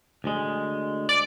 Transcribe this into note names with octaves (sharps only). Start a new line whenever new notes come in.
D2 G#3
D5